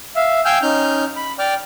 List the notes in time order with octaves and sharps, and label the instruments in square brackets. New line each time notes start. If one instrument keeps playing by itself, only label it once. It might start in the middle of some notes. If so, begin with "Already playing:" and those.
[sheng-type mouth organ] E5 F5
F5 G5 G#5 E6 F6 G6
C#4 D#4 F6 G6
B5
D5 G5 D6 F6